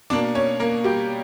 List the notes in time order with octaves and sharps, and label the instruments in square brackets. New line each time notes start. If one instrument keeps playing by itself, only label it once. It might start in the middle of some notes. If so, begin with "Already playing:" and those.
[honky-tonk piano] B2 A#3 D4 D5
C#4 C#5
A#3 A#4
G3 G4